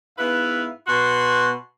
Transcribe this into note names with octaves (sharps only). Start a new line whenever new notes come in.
G#2 B3 E4 B4 E5 F5
B2 F#4 C6